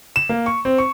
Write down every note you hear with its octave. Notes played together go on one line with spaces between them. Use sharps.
E7
A#3
C#6
C4
C#6